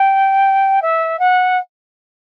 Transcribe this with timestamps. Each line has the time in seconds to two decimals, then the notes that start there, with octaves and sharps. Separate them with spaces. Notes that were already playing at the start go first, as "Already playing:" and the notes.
Already playing: G5
0.82 E5
1.19 F#5